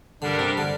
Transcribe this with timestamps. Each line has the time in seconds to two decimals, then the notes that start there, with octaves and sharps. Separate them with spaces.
0.22 G2 D3 G3 D4 G4 A#4
0.39 C3
0.57 D3